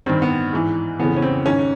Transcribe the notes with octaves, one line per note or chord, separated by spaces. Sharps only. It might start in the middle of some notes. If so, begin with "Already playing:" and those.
G2 D#3 C4
B3
G#2 E3
F2 C#3 E3 B3
C#4
C4
G#2 D#3 C#4